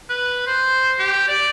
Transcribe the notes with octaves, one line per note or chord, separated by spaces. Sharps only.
B4
C5
G4
D5